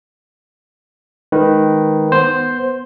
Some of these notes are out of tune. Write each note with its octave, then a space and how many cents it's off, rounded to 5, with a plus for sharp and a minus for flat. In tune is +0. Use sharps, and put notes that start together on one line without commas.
D#3 +0 G#3 +0 B4 +0
B3 +0 C5 +0